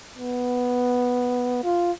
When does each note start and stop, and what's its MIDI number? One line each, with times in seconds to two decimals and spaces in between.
0.17 1.60 59
1.63 1.92 65